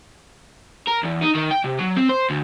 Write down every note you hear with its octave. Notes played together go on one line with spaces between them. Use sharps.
A#4
E2
D#4
D#3
G5
C3
F#3
C4
C5
D2